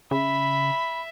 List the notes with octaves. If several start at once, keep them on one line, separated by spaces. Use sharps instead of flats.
C#3 E5 B5